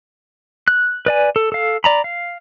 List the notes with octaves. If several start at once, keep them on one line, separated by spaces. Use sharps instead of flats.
F#6
B4 D5 G#5
A4
A4 F5
D5 A#5 B5
F5